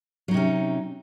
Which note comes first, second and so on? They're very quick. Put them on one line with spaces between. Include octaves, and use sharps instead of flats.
F#3 D#4 C3 C#4